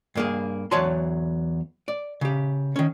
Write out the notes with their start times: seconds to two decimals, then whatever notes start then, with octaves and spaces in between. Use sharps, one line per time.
0.15 G2 A#3 G#4
0.71 E2 F#3 C#5 D5 A5 C6
1.88 D5
2.21 C#3 G4
2.76 D#3 C#4